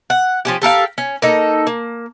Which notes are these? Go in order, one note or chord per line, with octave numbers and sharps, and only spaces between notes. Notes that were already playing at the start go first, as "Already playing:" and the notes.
F#5
F3 C#4 G4
G4 A4 A#4 F5
C#4
A#3 D#4 A4
A#3